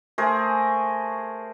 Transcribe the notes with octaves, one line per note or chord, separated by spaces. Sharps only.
A3 G#4 A#4 C5